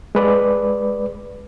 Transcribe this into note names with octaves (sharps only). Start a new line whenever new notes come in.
G#3 B4 D5